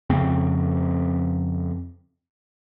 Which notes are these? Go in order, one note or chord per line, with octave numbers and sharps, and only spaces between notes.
F2 C#3 C4